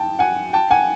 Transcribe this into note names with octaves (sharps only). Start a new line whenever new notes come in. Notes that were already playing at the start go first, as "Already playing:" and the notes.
Already playing: G5 A5
F#5 G#5
G5 A5
F#5 G#5